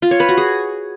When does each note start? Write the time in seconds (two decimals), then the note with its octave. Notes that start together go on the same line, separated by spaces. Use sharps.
0.02 F4
0.11 C#5
0.20 B4
0.29 F#4
0.37 G#4